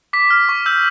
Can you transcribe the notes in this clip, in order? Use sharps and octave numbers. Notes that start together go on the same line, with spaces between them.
D6 B6
F6
C#6
E6 G6